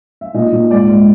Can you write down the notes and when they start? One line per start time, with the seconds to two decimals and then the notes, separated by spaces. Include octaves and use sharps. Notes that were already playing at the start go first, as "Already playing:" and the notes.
0.21 E5
0.34 A#2 D#5
0.52 A#2
0.70 G#2 D5
0.89 G#2